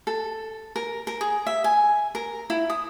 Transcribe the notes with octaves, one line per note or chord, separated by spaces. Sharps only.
A4
A#4
A#4
G#4
E5
G#5
A#4
E4
D#6